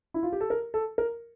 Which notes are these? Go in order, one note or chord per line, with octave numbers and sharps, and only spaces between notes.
E4
F4
G4
A4
A#4
A4
A#4